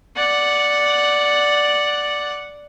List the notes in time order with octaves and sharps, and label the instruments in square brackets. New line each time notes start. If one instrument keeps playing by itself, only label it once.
[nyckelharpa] D5 F#5